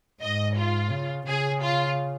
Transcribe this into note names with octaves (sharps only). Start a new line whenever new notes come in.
G#2 D#5
F4
C#3
C#3 G#4
F4